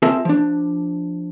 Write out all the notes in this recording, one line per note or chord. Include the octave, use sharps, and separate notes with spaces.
C4 F4 G#4 A#4 E5 A5
F3 D4